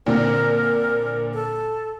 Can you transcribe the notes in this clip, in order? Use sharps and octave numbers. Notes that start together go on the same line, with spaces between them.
A#2 D3 C4 A#4
A4